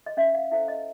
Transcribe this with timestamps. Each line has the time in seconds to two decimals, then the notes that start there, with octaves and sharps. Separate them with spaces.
0.06 D#5
0.17 C#4 E5
0.34 F5
0.51 E4 A4 C5 E5
0.68 D#5